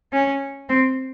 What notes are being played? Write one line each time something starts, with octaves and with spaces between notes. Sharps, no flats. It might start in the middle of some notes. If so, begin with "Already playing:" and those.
C#4
C4